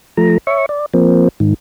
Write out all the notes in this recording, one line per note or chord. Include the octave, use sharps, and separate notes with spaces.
F3 A3 A#5
C#5 E5 C#6
D5
F3 A#3 C4
G#2 D#3